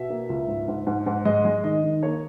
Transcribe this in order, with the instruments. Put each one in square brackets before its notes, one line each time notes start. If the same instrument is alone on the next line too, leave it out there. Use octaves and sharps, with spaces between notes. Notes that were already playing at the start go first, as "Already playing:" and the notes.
Already playing: [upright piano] B2 E5
A#3
C#2
G#2
G#2
G#2
G#2
G#3 D#5
G#3
D#3 D#5
D#3
A#3 C#5